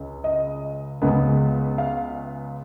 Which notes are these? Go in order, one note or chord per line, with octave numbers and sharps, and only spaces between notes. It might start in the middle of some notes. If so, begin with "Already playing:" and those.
Already playing: C#2 C#3
D#5
C#2 C#3 G#3 B3
F5